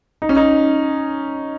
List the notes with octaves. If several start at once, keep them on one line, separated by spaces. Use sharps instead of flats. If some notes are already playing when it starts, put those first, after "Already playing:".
D#4
C#4
D#4